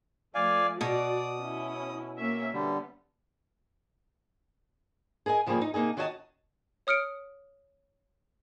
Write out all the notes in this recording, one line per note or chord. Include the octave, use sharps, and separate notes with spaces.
F3 A3 D5 F5 G#5
B2 F#4 D5 D#6
C#4 E4
A#3 C#4 E5
D3 G3 B3
G#4 A#4 D#5 G#5
C#3 F3 G3 A#3 G#4
D#4
C3 A#3 D#4 G#4
D#3 F#4 C#5 D#5 F5 A5
C#5 D#6 F6 C#7 D7